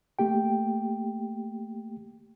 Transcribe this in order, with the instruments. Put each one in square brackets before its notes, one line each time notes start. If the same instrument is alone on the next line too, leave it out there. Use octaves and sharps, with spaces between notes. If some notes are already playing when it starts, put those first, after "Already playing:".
[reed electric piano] A3 A#3 G4 G5